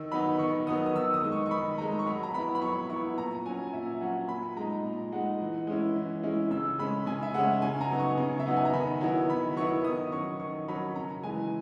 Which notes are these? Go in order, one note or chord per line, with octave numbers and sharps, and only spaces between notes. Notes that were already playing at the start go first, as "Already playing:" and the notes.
Already playing: D#3 E6
F#3 B3 D#4 B5
D#3 C#6
F#3 B3 D#4 D#6
D#6
D#3 E6
D#6
G#3 D#4
C#6
C#6
D#3 B5
G#3 D#4 A#5
C#6
F#3 B5
A#5
B3 E4 B5
B5
F#3 C#6
B3 E4 C#6
A#2 A#5
F#3 C#4 G#5
A#2 E5
F#3 C#4 F#5
A#2 B5
G#3 D#4 A#5
A#2
G#3 D#4 F#5
E3
G#3 C#4 E4
E3
G#3 C#4 E4
C#3 E6
G#3 C#4 B5
C#3 G#5
E5
G#3 C#4 F#5
C#3 G#5
A#5
F#3 B3 D#4
C#6
C#3
E5
F#3 B3 D#4 F#5
G#5
A#5
D#3 B5
F#3 B3 E4
D#3 B5
F#3 B3 E4 C#6
D#3 D#6
F#3 C#4 C#6
D#3 C#6
F#3 C#4 B5
C#3 A#5
E3 G#3 G#5